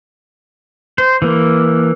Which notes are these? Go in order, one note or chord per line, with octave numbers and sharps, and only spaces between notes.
C5
E3 A#3